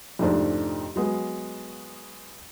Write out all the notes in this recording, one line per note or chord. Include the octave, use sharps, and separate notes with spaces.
F2 G#2 C3 A3 D4 C5
F#3 G#3 B3